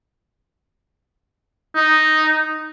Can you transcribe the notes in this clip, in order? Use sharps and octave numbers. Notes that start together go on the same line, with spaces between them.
D#4